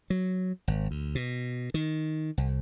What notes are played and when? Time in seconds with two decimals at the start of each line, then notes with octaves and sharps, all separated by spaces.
0.10 F#3
0.68 G#1
0.91 D2
1.15 B2
1.74 D#3
2.38 C2